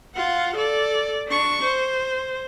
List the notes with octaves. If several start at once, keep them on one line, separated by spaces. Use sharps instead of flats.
F4 F#5
A4 D5
D4 C#6
C5